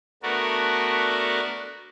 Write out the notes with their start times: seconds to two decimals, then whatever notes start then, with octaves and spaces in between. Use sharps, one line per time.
0.23 A3 B3 D4 F#4 A4 A#4